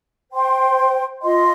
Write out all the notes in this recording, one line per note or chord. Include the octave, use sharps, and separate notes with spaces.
C5 G5 C6
F4 D#5 C6